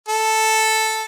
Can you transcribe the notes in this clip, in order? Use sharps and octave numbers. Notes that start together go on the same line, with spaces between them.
A4